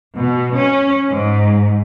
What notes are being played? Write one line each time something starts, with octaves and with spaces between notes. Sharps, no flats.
B2
C#4
G#2